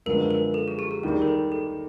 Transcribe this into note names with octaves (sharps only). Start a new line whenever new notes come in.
F#2 D3 F3 G#3 B3 A#4
A#4
A4
G#4
G4
G#4
D#2 D#3 G3 G#4
A#4
A4
A4